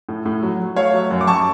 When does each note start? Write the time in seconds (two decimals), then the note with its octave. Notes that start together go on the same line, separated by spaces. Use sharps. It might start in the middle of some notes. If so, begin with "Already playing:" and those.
0.09 A2
0.25 A2
0.43 F#3
0.60 F#3
0.76 A3 C#5 F5
0.93 F#3
1.11 F#2
1.21 D6
1.27 F#2 A5 C#6